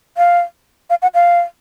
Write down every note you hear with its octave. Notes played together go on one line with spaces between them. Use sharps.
F5
F5
F#5
F5